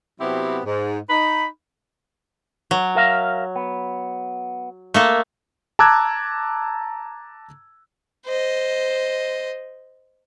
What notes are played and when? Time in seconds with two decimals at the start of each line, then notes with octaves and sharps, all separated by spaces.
0.21 C3 F#3 B3 C4 E4 G4
0.65 G#2
1.10 D#4 B5
2.71 F#3
2.96 A#4 E5 F5
3.56 B3
4.94 A3 A#3 A4
5.79 A5 A#5 D6 E6 F#6 G#6
8.26 C5 D#5